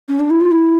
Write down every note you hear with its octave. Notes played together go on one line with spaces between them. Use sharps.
C#4
D4
E4
F4
E4